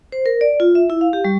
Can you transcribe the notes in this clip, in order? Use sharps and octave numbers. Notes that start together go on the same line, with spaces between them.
C5
A#4
D5
F4
E5
E4
F5
G4
G3